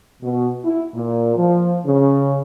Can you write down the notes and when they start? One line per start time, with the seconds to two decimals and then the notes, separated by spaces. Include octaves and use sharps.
0.22 B2
0.64 E4
0.94 A#2
1.36 F3
1.85 C#3